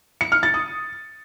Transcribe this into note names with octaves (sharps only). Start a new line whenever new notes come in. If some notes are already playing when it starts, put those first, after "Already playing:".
C#7
F6
A6
D#6